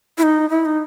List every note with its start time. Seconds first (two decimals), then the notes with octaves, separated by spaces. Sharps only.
0.18 E4
0.23 D#4
0.50 E4
0.65 D#4